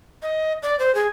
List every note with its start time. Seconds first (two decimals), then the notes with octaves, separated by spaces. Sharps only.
0.23 D#5
0.63 D5
0.79 C5
0.95 G#4